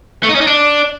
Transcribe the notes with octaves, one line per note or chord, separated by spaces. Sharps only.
A3
D#4
C#4
D#4
D4